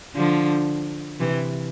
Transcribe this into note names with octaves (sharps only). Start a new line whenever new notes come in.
D3 F3
C3 E3